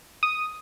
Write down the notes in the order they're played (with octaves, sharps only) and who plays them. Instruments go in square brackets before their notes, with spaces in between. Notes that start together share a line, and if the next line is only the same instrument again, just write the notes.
[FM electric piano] D#6